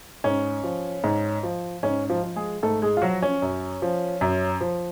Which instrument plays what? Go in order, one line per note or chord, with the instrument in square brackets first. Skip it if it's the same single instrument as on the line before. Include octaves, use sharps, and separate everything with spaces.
[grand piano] G#2 C#4
F3
G#2
F3
G#2 C#4
F3 F4
F3
G#3 G#4
G#2 A3 A4
G#3 G#4
F4
F3 F#3 F#4
C#4
F#2
F3
F#2
F3